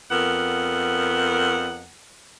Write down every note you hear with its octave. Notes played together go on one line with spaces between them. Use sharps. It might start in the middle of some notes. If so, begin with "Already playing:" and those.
F2 B3 A#4 F#5